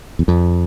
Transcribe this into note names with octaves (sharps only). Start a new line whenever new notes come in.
E2
F2